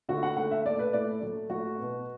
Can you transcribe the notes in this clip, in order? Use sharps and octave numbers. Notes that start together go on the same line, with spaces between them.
D3 A3 F#4
F#5
D3 A3 F#5
E5
A2 A3 D5
B4
A2 A3 D5
A2 F#3 A3
A2 F#3 A3 F#4
B2 B3